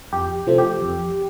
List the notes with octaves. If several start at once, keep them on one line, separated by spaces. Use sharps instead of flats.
F2 G4
C3 F3 A3 C4
G4
F2